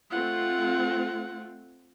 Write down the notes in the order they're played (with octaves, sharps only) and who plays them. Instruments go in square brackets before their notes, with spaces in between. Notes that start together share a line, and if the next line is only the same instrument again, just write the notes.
[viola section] A3 C4 F4 [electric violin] F#5